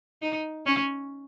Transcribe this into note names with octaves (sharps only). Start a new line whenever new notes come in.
D#4
C#4